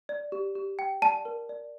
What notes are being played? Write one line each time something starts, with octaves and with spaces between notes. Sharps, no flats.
D5
G4
G4
G5
D5 A5
A#4
D5